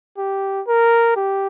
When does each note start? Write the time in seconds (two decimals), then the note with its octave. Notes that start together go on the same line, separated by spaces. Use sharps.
0.18 G4
0.68 A#4
1.16 G4